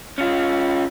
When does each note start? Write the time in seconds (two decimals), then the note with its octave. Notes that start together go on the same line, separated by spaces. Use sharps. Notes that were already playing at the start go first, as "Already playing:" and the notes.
0.18 C#4 F4